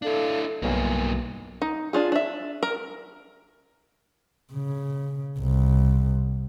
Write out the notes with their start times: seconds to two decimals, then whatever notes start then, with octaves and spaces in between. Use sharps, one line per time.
0.02 D4 E4 A4 F5
0.62 B1 G2 A#3 G#5
1.62 D#4
1.93 D4 F4 G#4
2.12 D4 E5
2.63 A#4
4.53 C#3
5.39 C2